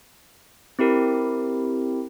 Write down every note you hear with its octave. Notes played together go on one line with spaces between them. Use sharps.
C4 E4 G4 A#4